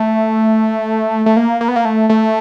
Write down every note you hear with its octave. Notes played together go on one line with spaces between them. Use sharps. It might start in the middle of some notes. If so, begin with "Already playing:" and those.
Already playing: A3
A3
A#3
A#3
B3
A#3
A3
A3